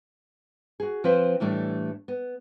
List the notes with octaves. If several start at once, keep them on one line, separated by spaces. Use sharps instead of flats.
F#4 G#4
F3 C4 B4 C5
A2 E3 G3 A3 D4
B3